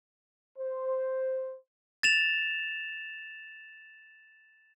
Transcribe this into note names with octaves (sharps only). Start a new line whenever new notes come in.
C5
A6 E7 F7